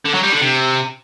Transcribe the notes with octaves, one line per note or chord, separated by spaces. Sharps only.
D3
F#3
G3
D3
C3